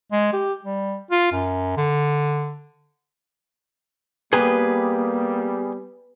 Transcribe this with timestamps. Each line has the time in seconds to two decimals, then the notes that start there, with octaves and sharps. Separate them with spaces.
0.12 G#3
0.33 G4
0.64 G3
1.11 F4
1.32 F#2
1.77 D3
4.33 G3 A#3 B3 G4 G#4 B4